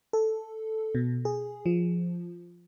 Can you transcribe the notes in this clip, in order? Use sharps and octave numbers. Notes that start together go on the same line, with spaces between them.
A4
B2
G#4
F3